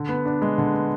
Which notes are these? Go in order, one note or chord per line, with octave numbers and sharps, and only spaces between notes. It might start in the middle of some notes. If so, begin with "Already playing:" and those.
Already playing: D3
B3
D4
G#3
D3
B3